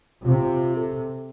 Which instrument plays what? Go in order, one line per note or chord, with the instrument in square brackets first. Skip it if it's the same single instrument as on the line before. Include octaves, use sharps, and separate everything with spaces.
[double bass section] C3 [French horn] F4
[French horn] A4